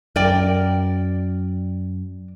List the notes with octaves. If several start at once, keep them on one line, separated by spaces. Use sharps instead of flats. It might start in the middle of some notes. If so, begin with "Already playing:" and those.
F#2 A#4 D5 G5